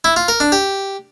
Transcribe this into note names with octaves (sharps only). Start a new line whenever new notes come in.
E4
F4
A#4
D4
G4